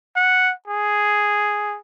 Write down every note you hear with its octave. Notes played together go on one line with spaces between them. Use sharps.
F#5
G#4